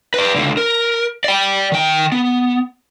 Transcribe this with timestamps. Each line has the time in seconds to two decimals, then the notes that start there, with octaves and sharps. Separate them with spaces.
0.14 B4 D5
0.36 C#2 D3
0.57 A#4
1.24 D5 G5
1.72 D#3 G5
2.12 B3